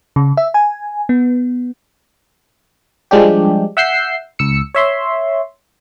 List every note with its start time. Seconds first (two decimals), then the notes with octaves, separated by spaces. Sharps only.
0.16 C#3
0.37 E5
0.54 G#5
1.09 B3
3.11 F3 G3 G#3 D4 G4
3.77 E5 F#5 E6 G6 C7
4.39 C#2 E6 C#7
4.75 C#5 E5 C6